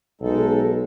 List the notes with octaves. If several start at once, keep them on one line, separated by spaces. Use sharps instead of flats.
B1 G#3 D#4 A4